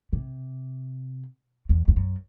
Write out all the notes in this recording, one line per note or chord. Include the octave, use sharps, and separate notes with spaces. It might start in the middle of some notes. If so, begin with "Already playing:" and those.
C3
E2
E2
F#2